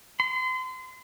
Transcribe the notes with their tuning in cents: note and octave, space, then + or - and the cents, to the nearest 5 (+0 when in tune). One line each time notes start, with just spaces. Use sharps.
C6 -35